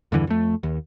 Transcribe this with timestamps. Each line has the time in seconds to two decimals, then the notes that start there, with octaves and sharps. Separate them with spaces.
0.12 E2 G2 D3 E3
0.27 F2 A3
0.63 D#2